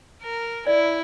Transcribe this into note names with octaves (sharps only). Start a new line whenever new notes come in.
A#4
E4 D5